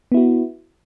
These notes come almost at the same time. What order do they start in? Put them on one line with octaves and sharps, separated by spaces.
B3 E4 F#4